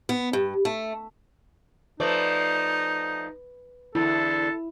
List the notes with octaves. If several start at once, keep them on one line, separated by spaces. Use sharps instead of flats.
B3
G2
A3
F3 A3 D#4 B4 D5
E2 D3 E4 A4